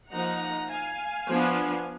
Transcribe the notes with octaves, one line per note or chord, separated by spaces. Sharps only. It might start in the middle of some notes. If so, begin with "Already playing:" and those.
F3 A#3 D#4 F#5 A#5
F5 G#5
F3 B3 D4